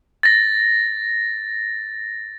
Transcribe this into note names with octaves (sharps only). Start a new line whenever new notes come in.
A6 A#6